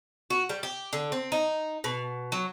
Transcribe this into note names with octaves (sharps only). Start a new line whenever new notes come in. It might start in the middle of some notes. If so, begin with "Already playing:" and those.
F#4
G3
G4
D3
C4
D#4
B2
F#3